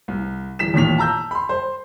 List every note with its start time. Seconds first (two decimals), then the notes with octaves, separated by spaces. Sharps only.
0.08 C2
0.59 D1 E3 B6 E7
0.74 A1 D#2 A#2 B6 F7
0.98 A5 A#5 E6 G6
1.31 B5 C6
1.49 C5